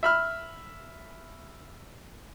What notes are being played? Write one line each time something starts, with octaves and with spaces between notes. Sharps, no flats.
E5 B5 F6